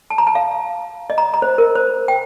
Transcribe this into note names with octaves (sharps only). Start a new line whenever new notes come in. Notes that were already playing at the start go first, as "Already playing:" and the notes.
A5
A#5
A5
F5
D#5
A#5
A#5
C5
A#4
C5
G5